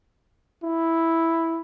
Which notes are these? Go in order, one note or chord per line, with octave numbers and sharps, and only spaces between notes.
E4